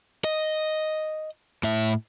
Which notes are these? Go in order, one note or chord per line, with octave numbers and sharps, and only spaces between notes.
D#5
A2 E5